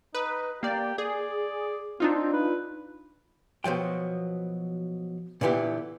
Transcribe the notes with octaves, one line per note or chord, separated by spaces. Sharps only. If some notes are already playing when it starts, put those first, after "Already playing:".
D#4 B4
A#3 G4 D5
G#4 D5
C4 D4 D#4 F4
B4
B2 F3 F#3 G5
A#2 D3 E3 B3 G4